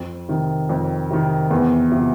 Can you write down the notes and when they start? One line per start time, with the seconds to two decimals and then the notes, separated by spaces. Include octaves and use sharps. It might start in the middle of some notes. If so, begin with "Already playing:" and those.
Already playing: F2
0.28 C3 D#3
0.69 F2
1.10 C3 D#3
1.50 E2
1.91 C3 F3